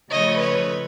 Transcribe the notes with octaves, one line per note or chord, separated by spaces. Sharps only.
C#3 F3 A3 C#5 D#5
B4 C#5